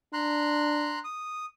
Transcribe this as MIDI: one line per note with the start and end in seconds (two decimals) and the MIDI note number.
0.13 1.02 62
0.13 0.99 82
0.13 0.99 84
0.13 0.99 90
1.04 1.45 87